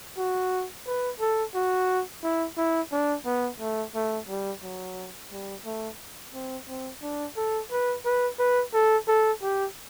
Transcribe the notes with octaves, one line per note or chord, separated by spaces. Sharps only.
F#4
B4
A4
F#4
E4
E4
D4
B3
A3
A3
G3
F#3
G3
A3
C4
C4
D4
A4
B4
B4
B4
A4
A4
G4